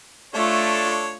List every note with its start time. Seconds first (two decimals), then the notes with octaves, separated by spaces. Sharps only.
0.34 A3 D4 F4 A4 C#5